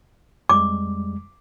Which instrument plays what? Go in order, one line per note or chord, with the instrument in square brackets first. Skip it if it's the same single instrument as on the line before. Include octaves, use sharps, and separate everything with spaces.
[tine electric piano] F2 G3 G#3 [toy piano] D6